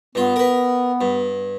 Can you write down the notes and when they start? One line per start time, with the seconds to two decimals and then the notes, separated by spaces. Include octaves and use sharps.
0.15 G2 B3 F4
0.36 A#4 B4
1.01 G2